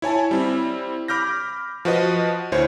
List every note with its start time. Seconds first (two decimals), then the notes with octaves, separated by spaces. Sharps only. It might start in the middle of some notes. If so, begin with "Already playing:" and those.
0.02 E4 C#5 G#5 A5
0.31 G3 C4 E4
1.08 B5 D6 F6 G6 A#6
1.85 F3 F#4 B4 D#5
2.52 D2 E4 C5 C#5 G#6